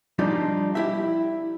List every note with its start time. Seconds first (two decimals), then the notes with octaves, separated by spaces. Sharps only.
0.19 F3 G3 D4 D#4 F4
0.75 E4 G4 E5